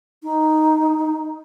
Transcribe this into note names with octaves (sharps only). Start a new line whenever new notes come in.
D#4